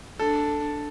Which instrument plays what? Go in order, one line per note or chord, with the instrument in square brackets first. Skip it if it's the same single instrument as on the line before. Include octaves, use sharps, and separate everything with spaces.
[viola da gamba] D4 [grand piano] A4